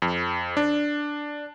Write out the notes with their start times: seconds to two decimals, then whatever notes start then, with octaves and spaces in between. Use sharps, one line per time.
0.02 F2
0.57 D4